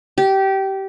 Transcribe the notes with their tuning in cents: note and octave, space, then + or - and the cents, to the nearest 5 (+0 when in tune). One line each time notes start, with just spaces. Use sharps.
G4 -20